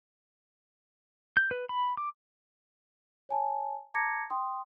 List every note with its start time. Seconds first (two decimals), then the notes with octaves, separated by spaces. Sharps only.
1.37 G6
1.51 B4
1.69 B5
1.97 D6
3.29 C#5 G#5 A5
3.94 A5 A#5 D6 G#6 A#6 C#7
4.30 G5 C6 D#6